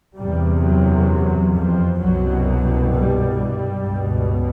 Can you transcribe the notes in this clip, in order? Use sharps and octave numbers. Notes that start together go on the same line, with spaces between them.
E2 G2 C3 G3
F#2 F#3
F2 F3
C2 F#2 B2 F#3
G2 G3
G2 G3
C#2 B2